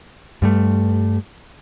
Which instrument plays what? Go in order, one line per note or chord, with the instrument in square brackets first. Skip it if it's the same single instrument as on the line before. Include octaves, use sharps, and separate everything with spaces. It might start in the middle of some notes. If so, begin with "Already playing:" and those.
[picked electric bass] G2 G3 A3